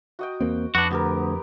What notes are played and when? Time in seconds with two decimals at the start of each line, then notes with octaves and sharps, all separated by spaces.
0.19 F#4 D#5 G5
0.41 E2 A#3 C4
0.75 F2 B3 D4 F#4
0.91 D2 B3 G4 A#4